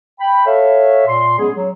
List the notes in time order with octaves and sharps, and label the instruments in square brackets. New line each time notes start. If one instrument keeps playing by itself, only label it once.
[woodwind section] G5 B5
A4 C#5 E5 F5
A#2 C6
F#3 G#3 B3 C#4 G#4
F#3